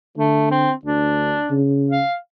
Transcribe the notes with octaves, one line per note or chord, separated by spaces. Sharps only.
D3 A3
C4
D2 D4
C#3
F5